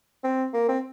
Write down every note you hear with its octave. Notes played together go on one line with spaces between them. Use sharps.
C4
A#3
C4